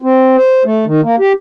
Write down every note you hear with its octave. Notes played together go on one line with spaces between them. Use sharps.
C4
C5
A3
D#3
A#3
G4